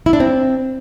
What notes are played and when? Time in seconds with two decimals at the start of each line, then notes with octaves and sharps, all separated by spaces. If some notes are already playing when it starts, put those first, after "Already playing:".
0.06 E4
0.13 D4
0.20 C4